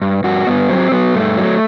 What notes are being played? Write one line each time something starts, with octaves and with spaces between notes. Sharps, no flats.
G2
G2 F#4
G2 B3
F#3 C4
F#3 B3
G2 A3
F#3